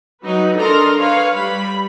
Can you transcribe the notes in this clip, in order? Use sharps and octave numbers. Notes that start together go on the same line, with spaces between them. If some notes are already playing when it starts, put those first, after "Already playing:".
F#3 D#4 B4
D4 A4 A#4 D#5 A#5 C6
B4 C#5 F5
G3 B5